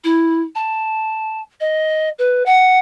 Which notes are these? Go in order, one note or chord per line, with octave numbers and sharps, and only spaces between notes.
E4
A5
D#5
B4
F#5